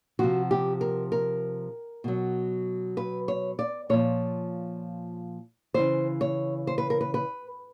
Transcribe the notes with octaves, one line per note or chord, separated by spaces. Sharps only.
C3 F3 F#4
G4
A#4
A#4
B2 F#3
B4
C#5
D5
A#2 F3 C#5
C#3 E3 C5
C#5
C5
B4
A#4
B4
B4